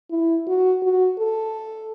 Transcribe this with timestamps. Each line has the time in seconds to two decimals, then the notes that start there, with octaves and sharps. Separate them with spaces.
0.11 E4
0.47 F#4
0.83 F#4
1.19 A4